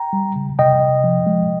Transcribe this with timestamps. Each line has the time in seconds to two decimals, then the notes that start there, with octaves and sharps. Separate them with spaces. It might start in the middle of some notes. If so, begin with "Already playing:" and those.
Already playing: G5 A#5
0.13 G3
0.36 C#3
0.59 C3 D#5 G5
0.81 C3
1.04 F3
1.26 G#3